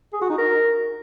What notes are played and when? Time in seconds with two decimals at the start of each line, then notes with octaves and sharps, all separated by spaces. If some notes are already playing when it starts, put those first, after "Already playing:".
0.13 G#4
0.21 F#4
0.30 D#4
0.38 A#4